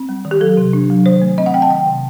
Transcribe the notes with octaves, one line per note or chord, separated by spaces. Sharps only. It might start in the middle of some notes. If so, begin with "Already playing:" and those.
Already playing: C4
G3
D#3
G4
F#3 A4
C3
D4
F#3
D#3 C5
A3
C4 D#5
F#5
C4 G5
A5
D#3 G5
C3